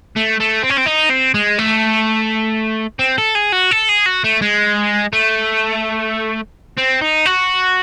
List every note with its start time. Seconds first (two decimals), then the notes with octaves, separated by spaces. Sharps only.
0.16 A3
0.40 A3
0.64 C4
0.71 C#4
0.78 C4
0.86 D#4
1.10 C4
1.34 G#3
1.59 A3
2.99 C4
3.18 A4
3.35 G#4
3.52 F#4
3.71 A4
3.89 G#4
4.06 F#4
4.24 A3
4.42 G#3
5.13 A3
6.77 C4
7.01 D#4
7.26 F#4